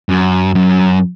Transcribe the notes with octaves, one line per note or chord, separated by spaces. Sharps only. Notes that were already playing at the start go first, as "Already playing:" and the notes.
F#2
F#2